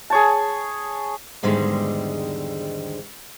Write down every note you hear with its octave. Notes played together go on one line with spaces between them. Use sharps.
G#4 C#5 A5
E2 G#2 D3 D#3 G3 G#3